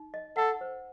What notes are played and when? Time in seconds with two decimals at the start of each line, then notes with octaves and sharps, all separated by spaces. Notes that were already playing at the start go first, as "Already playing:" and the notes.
Already playing: D#4
0.14 D#5
0.37 A4 F#5
0.61 C5